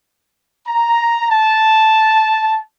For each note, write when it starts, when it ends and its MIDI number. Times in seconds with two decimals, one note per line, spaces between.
0.68 1.30 82
1.31 2.61 81